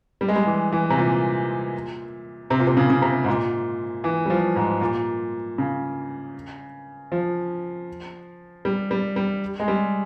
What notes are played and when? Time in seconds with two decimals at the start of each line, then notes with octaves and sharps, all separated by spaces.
0.21 G3
0.28 G#3
0.36 G3
0.46 E3
0.72 E3
0.90 C3
0.98 A#2
2.50 C3
2.59 A#2
2.67 C3
2.77 C#3
2.90 C#3
3.02 C3
3.24 G#2
3.28 A#2
4.04 E3
4.26 G3
4.30 F3
4.56 G#2
4.81 A#2
5.58 C#3
7.12 F3
8.65 G3
8.91 G3
9.16 G3
9.60 G#3
9.68 G3